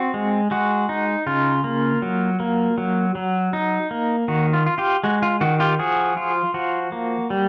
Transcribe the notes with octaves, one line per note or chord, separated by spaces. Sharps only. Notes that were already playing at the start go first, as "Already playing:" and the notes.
Already playing: C4 F#4
G#3
G#3 F#4
D#4
C#3 F4
A#3
F#3
A#3
F#3
F#3
D#4
A#3
D#3 F#4
F4
F4
F4 G4
G#3 F#4
F4
D#3 F#4
F4 G4
F3 F#4 G#4
F4
F3 F#4
A#3
G3